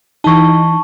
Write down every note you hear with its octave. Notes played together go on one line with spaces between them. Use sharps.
E3 D#4 A5 C#6